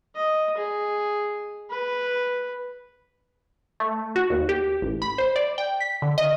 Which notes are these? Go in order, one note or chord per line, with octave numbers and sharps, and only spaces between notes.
D#5
G#4
B4
A3
F#4
D#2
G4
A1
B5
C5
D5
G5
B6
D3
D#5